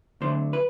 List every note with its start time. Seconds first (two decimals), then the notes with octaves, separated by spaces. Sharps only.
0.21 D2 D3 F#3 C5
0.53 B4